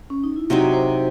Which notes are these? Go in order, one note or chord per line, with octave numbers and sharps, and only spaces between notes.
C#4
D#4
E4
C3 F#3 C4 D#4 F#4
C5